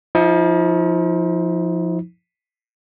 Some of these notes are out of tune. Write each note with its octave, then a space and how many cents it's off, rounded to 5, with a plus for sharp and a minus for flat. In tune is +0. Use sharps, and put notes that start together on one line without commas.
F3 +0 D#4 +45